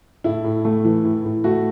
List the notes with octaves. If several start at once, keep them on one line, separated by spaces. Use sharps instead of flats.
A2 E4
A2
A3
E3
A2
A2
A3 F#4